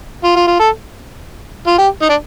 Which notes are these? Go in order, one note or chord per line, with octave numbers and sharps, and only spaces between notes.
F4
F4
F4
A4
F4
G4
D#4
D4